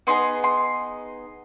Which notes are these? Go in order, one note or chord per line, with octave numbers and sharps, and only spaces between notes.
B3 D#4 G#4 C6
C6